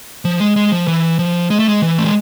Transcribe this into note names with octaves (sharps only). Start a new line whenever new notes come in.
F3
G#3
G#3
F3
E3
F3
G#3
A3
G#3
E3
A3
G#3